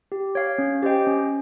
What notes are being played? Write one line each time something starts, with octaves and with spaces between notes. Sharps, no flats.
G4
C#5 F5
C#4
G4 C5 D#5 G5
C#4